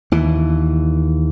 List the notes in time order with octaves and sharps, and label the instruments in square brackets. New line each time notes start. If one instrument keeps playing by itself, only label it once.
[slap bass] D#2 E3